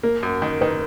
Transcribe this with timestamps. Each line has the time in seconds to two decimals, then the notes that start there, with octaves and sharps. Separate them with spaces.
0.03 A#3 A#4
0.23 F#2
0.42 D#3
0.61 D#3 B4